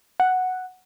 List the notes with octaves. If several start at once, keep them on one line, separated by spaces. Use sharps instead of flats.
F#5